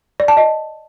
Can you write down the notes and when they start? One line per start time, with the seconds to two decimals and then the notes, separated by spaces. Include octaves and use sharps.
0.20 D5
0.28 A5
0.37 D#5